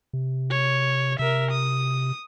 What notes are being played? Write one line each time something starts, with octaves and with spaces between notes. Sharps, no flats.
C3
C#5
C3 A#4 E5
D#6